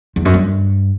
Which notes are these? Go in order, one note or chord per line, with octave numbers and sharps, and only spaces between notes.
E2
F#2
G2